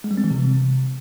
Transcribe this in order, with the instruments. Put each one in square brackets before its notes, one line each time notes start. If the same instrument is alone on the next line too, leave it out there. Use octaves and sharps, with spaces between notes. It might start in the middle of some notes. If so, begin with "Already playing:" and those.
[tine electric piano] G#3
G3
C4
E3
C3